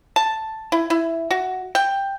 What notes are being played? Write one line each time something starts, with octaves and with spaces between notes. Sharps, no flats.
A5
E4
E4
F#4
G5